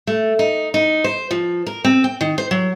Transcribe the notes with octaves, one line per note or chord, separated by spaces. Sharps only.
A3
D#4
D#4
C5
F3
A#4
C4
G5
D#3
C5
F#3